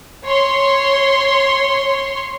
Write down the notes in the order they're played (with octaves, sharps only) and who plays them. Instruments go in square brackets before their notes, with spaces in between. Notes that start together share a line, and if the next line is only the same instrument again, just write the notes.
[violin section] C#5 C6